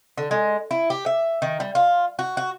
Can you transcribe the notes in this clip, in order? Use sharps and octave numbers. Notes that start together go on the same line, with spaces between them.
D3
G#3
E4
G4
E5
D#3
G3
F4
F#4
F#4